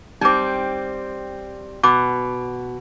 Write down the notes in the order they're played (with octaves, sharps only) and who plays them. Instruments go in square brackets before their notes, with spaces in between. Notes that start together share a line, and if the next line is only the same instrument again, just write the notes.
[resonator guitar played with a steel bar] G3 C4 [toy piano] D#4 D6
[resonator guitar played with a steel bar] B2 [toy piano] D6